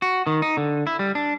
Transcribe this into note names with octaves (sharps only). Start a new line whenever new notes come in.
F#4
D#3
D#4
D3
E4
G3
D4